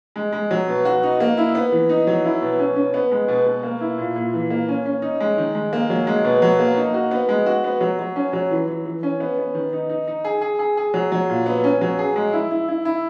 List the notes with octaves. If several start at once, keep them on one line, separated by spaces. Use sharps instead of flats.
G#3
G#3
F#3
B2
F#4
D#4
A#3
E4
B3
E3
D#4
F#3
E4
B2
C#4
C#4
B3
G#3
B2
B2
A#3
E4
A#2
A#2
E3
A#3
C#4
C#4
D#4
G#3
D#3
G#3
A#3
F#3
G#3
B2
F#3
A#3
D#4
F#4
B3
G#3
F#4
B3
F#3
F#3
C#4
F#3
E3
E3
E3
C#4
B3
B3
D#3
D#4
D#4
D#4
G#4
G#4
G#4
G#4
F#3
F#3
A#2
B3
C#4
F#3
G#4
G#3
E4
E4
E4
E4